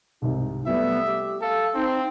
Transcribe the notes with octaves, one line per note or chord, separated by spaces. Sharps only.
C2 G#2 C3 D#4
G3 A3 B3 E4 E5
G4
A4 F5
C4 D#4